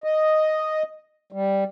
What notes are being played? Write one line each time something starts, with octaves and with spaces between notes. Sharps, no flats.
D#5
G3